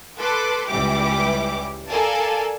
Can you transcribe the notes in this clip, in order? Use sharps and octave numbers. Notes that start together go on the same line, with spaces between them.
A4 B4 C6 D6
C#2 E3 G3 G4 D6
A4 A#4 D5 F5 G#5 A5